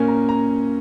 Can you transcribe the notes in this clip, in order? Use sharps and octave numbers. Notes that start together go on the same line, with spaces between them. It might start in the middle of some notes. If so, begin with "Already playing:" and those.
Already playing: A#2 A#3 C#4 G#5
A#5
A#5